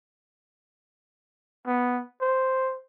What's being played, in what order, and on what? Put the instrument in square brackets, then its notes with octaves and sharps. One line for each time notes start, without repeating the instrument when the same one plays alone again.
[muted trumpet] B3
C5